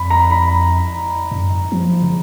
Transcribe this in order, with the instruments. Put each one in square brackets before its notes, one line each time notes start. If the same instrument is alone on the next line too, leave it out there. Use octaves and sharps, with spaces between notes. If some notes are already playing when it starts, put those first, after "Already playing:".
Already playing: [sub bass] F2 [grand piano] B5
[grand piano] A#5
B5
[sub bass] F#2
F3
C#3